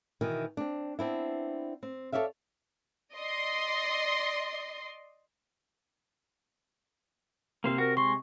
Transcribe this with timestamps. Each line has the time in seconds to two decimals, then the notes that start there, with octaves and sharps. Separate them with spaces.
0.21 B2 D#3 E3
0.57 C4 D4
0.99 B3 C4 D4 E4
1.83 C4
2.12 A4 B4 C#5 D5 E5 F5
3.13 D5 D#5 C6
7.64 C3 A#3 C4 C5 F5
7.78 F#4 A#4
7.97 G#3 C6 C#6 A#6